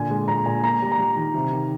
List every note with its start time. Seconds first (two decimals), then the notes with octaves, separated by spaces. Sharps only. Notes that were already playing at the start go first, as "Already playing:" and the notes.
Already playing: A#2 D3 G#5
0.10 G#3
0.28 A#2 A#5
0.46 A#2 G#5
0.63 A#3 A#5
0.82 G3
0.92 A#5
0.99 G3
1.16 D#3
1.34 C3
1.53 D#3